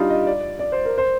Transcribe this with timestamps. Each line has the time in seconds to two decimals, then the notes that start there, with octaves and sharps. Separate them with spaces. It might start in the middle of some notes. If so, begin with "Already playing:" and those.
Already playing: G3 D4 D#4 F4
0.10 D#5
0.27 D5
0.59 D5
0.72 C5
0.85 A#4
0.98 C5